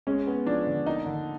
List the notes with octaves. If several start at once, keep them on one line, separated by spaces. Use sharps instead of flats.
G#3 C#4
B3
F3 D4
D3
A#3 D#4
D3